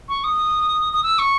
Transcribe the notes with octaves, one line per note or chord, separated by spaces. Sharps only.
C#6
D#6
D#6
E6
C#6